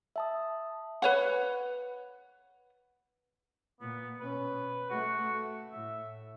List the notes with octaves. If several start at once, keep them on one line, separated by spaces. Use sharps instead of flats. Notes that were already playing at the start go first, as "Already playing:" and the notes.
E5 A5 D#6
B4 C#5 F#5
A#2 B3
B2 C#4 B4
A3 F#4
A2 E5